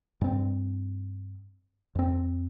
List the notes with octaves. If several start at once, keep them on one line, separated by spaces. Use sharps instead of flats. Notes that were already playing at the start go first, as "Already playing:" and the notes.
G2 C4
F2 C4